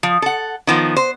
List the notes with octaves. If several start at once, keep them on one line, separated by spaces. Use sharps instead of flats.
F3
A4 F#5
D#3 F3 B3
C5